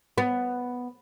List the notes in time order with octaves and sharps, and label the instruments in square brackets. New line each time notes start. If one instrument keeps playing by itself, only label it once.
[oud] B3